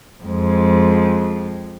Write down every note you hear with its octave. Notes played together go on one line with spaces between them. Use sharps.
F2 G#3